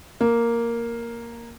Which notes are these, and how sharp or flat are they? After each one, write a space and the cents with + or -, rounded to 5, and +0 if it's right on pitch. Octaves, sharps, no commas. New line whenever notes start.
A#3 +0